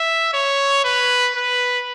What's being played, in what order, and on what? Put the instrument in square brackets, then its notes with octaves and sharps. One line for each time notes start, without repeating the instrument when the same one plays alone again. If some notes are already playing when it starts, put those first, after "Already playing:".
Already playing: [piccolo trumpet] E5
C#5
B4
B4